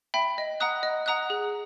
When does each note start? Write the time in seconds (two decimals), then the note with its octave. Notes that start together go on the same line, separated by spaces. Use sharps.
0.14 E5 G5 B5
0.38 D#5
0.60 F#5 A#5 D#6 F#6
0.83 D#5
1.06 F#5 A#5 D#6 F#6
1.30 G#4